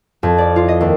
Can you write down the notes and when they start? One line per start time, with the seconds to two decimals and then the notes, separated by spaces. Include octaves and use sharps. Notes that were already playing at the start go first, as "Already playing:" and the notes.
0.23 F2
0.38 D5
0.56 F4
0.68 D#5
0.81 D#2